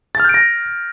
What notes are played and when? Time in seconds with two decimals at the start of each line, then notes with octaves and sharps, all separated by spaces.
0.15 A6
0.20 F6
0.24 G6
0.29 D7
0.34 A#6